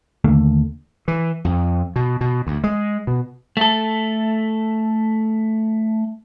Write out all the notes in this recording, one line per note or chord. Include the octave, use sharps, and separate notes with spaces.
D#2 D3 A3 A#3
E3
F2
B2
B2
D2
G#3
B2
A3 A4